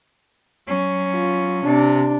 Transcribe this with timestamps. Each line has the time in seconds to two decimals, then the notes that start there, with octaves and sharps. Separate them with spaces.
0.67 F#3 C#4
1.13 F4
1.64 C3 D4